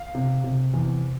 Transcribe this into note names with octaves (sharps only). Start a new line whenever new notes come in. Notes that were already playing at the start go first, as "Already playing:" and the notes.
Already playing: F5
C3
C3
E2